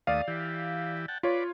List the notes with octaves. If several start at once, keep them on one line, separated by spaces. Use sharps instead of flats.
D#2 A3 D5 F5 D#6
E3 G4
F#5 G5 A5
F4 B4 C#5 D5